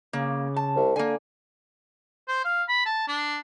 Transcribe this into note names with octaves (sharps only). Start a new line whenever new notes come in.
C#3 A#3
A5
C2
D3 A#3 G#5
C5
F5
B5
A5
D4